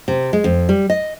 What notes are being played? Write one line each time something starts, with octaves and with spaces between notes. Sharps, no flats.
C3
G#3
F2
G3
D#5